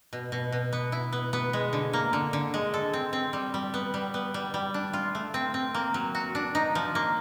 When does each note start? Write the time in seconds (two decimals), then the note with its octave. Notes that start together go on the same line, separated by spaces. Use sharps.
0.13 B2
0.32 B2
0.52 B2
0.73 B3
0.92 E4
1.13 B3
1.33 B3
1.53 G#3
1.73 D3
1.93 A#3
2.13 D3
2.33 D3
2.54 G#3
2.74 A4
2.93 C4
3.13 C4
3.33 G3
3.54 G3
3.74 B3
3.94 G3
4.14 B3
4.34 G3
4.54 G3
4.74 D4
4.93 F4
5.15 A3
5.34 C4
5.54 C4
5.74 A#3
5.94 F#3
6.15 F#4
6.35 D4
6.55 D#4
6.75 F3
6.95 A#3